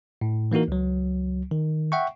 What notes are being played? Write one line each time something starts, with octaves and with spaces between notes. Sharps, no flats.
A2
E3 A#3 D#4 F#4 A#4
C#2 F#3
D#3
E5 F#5 G5 C#6